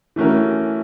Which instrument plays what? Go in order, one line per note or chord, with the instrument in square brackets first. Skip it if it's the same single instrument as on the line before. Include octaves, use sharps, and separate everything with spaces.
[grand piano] E3 A3 C#4 F#4 A#4